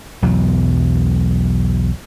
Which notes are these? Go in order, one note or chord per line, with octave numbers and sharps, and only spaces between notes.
B1 E2 F#3